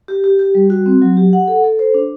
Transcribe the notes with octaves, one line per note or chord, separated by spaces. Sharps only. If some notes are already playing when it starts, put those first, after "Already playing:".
G4
G4
G4
G3
F#4
C4
F#3
G4
F#5
A4
A4
C5
D4